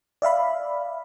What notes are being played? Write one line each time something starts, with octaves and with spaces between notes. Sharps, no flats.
D5 E5 F5 B5